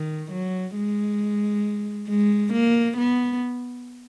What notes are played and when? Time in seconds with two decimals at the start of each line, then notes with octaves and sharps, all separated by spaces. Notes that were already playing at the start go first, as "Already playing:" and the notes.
Already playing: D#3
0.31 F#3
0.76 G#3
2.09 G#3
2.53 A#3
2.97 B3